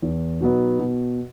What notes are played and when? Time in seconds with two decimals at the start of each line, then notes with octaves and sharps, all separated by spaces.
0.02 E2
0.41 B2 F#3 B3 D#4
0.79 B2